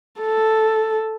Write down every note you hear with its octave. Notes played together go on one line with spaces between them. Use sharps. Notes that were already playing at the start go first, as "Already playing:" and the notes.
A4